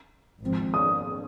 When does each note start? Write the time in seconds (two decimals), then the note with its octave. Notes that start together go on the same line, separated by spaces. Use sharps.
0.41 G#1 G#2 F3 C4
0.74 D#6